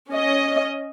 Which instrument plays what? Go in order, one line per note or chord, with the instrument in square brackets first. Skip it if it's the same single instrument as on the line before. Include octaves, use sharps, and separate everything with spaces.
[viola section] C#4 D#5